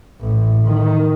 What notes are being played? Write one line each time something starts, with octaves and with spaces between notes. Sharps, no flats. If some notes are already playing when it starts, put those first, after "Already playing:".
A1
D#3